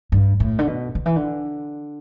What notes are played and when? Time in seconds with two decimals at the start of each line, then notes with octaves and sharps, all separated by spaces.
0.12 G2
0.40 A2
0.59 D3
0.67 B2
0.95 D3
1.06 E3
1.16 D3